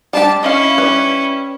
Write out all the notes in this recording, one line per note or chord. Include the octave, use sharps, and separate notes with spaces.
G3 D4 G4 A5
C#4 E4 D#5 F5
G3 B4